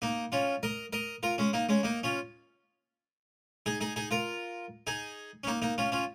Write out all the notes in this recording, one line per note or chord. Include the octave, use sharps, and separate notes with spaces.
A#3 D#4
C#4 F4
A#4 D#5
A#4 D#5
F4 A#4
G#3 C#4
A#3 D#4
G#3 C#4
A#3 D#4
C#4 F4
D#4 G#4
D#4 G#4
D#4 G#4
F4 A#4
D#4 G#4
C#4
A#3 D#4
A#3 D#4
C#4 F4
C#4 F4